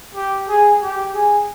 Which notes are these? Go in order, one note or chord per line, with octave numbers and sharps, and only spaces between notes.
G4
G#4
G4
G#4